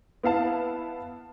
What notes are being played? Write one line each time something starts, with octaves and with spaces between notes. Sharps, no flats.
B3 E4 F5 A5